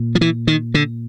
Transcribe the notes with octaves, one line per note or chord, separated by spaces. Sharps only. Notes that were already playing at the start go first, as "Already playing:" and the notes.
Already playing: A#2
F3
E3
D#3
D3